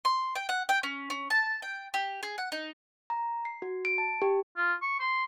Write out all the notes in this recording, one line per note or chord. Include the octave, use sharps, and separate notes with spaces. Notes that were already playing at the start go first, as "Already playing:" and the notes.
C6
G5
F#5
G5
C#4
C#4
A5
G5
G4
G#4
F#5
D#4
A#5
C7
F#4
D7
A5
G4
F4
C#6
C6